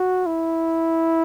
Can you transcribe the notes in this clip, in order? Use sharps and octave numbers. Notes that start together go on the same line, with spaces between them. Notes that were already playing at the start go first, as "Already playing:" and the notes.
Already playing: F#4
E4